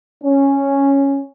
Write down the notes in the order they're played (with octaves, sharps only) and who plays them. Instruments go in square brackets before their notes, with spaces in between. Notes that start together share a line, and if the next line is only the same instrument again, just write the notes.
[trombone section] C#4